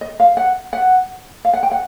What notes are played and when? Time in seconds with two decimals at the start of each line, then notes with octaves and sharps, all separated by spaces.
0.01 D#5
0.20 F5
0.37 F#5
0.73 F#5
1.45 F5
1.53 F#5
1.63 G5
1.71 F#5